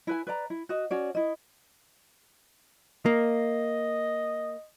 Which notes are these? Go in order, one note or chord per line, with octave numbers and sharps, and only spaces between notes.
E4 B4 G#5
B4 D5 A#5
E4
F#4 D#5
C#4 F#4 D5
E4 D#5
A#3 D#5